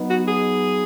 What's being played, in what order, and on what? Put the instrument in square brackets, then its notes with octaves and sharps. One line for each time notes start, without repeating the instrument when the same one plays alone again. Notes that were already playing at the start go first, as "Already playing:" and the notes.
Already playing: [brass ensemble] F#3 B3 D#4
[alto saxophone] F#4
G#4